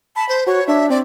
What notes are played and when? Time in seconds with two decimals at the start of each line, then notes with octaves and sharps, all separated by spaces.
0.16 A5 B5
0.29 C5
0.47 F#4 C#5
0.68 D4 E5
0.90 C4 D5